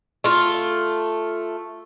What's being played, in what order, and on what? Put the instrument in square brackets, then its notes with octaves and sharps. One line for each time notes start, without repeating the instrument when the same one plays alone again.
[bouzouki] A3 F4